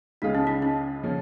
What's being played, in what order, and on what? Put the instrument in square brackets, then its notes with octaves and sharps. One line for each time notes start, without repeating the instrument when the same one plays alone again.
[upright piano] C#2 C#3 G#3 F4 G#4 [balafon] D#4
[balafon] C#4
D#4
C#4
[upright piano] C#3 F3 C#4